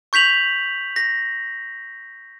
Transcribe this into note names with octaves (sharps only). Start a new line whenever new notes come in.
C#6 G6 B6 F7 F#7
A#6